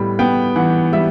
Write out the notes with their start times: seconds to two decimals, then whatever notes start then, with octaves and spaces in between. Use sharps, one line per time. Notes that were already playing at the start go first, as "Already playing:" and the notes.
Already playing: A2 G3 B3 B5
0.19 B3 G5
0.56 E3 F#5
0.92 G3 E5